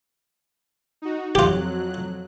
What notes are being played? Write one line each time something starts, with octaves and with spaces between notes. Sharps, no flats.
D#4 F#4
F2 F#3 F4 G4 F#6